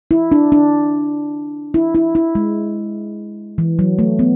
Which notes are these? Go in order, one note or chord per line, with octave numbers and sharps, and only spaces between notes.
E4
D4
D4
E4
E4
E4
G#3
E3
F#3
A3
B3